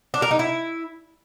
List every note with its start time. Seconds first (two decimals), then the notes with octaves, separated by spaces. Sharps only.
0.14 D4
0.22 A#4
0.31 D#4
0.39 E4